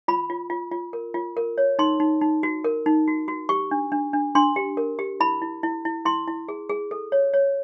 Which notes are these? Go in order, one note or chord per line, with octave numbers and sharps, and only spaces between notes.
F4 B5
F4
F4
F4
A#4
F4
A#4
C#5
D#4 C6
D#4
D#4
F#4
A#4
D#4
F#4
F#4
G4 C#6
D4
D4
D4
D4 C6
G4
A#4
G4
E4 B5
E4
E4
E4
E4 C6
E4
G#4
G#4
A4
C#5
C#5